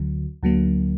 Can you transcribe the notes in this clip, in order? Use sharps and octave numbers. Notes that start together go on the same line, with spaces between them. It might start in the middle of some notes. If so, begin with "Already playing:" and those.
Already playing: D2 D3 F#3
D2 D3 F#3 A#3